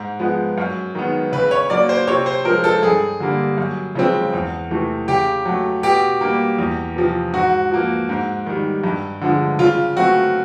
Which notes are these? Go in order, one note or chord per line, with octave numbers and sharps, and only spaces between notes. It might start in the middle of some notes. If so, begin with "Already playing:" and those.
Already playing: G#2
F3 G#3 B3
F#2
D#3 G#3 B3
C#3 B4
C#5
F#3 A#3 D5
C5
C3 C#5
C5
F3 G#3 A#4
A4
G2 G#4
D3 G3 A#3
F#2
C#3 F3 G#3 C4
E2
C3 E3 A3
C#3 G4
F#3 A3
B2 G4
G3 A#3
E2
C3 F3
G#2 F#4
F3 A#3
G#2
D#3 G3
G2
D3 F3 G#3
C#3 F4
F#3 A3 C4 F#4